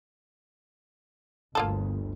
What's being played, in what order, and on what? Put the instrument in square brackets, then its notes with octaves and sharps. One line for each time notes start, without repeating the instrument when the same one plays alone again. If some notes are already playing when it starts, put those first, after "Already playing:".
[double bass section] G1 D2 [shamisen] A#3 F4 A4